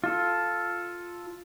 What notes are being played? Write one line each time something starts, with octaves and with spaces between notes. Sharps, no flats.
F4 A4